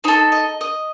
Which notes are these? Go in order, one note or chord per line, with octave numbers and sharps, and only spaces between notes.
D#4 A4 C5
D#5
D#5